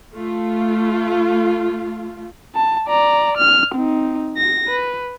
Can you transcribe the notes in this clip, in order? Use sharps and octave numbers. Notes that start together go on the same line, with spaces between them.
A3 F4
A5
D5 A#5
F6
C4 D#4
A#6
B4